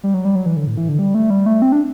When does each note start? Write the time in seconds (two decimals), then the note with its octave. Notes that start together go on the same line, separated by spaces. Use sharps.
0.04 G3
0.14 F#3
0.25 G3
0.35 F#3
0.46 E3
0.56 D3
0.67 A2
0.77 E3
0.88 D3
0.99 G3
1.15 A3
1.30 G3
1.46 A3
1.62 C4
1.72 D4